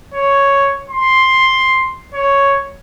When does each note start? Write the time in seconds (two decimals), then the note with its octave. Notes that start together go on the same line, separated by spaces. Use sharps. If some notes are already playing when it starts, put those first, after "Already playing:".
0.14 C#5
0.90 C6
2.14 C#5